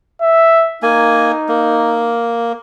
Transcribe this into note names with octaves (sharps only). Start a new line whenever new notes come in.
E5
A#3 D#4 G#5
A#3